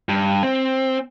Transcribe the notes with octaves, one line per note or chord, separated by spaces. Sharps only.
G2
C4